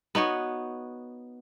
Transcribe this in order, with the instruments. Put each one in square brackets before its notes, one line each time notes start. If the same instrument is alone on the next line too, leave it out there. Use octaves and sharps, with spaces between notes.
[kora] B3 D#4 F#4 C#5